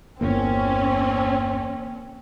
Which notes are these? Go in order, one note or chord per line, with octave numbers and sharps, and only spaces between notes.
G1 E2 A#3 C4 C#4